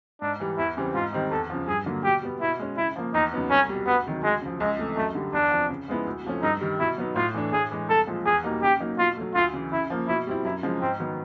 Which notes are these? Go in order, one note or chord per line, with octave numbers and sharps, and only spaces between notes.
G#2 D4
E3 G3
E2 E4
C#3 E3 G3 C4
G#2 F4
D#3 G3 C4 D#4
E2 A4
C#3 F3
G2 G#4
D3 F#3 A#3
B2 G4
G3 B3
B2 E4
G#3 C#4
C#3 E4
F3 A#3
E2 D#4
C#3 F#3 B3 D#4
C2 C#4
B2 G3
D2 B3
C3 D#3 F#3
D2 G#3
C#3 F3
C#2 G#3
C3 E3 A3
F#2 A3
D3 G3
E2 D4
C3 F3
C#3
F3 G#3 B3 E4
D2
C3 F3 A3 C#4
G2 D#4
D#3 G3
B2 E4
F#3 B3 D#4
A2 F4
E3 A3 D4
A2 G#4
E3 G#3
C2 A4
A#2 F3 G#3
E2 G#4
B2 G3 A#3 D#4
C#3 G4
F#3 A#3 D#4
B2 F4
F#3 A3
D2 F4
C#3 E3
C#3 E4
F3 A#3
B2 E4
G3 C4 E4
F#2 E4
C#3 F3 G#3
G#2 C4
D#3 F#3 B3